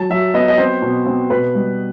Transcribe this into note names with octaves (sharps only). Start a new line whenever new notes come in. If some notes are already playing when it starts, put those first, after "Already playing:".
Already playing: F#3 A5
F#3 E5
B3 D#5
D#5
C4 C5
B2
C4
B2 B4
G3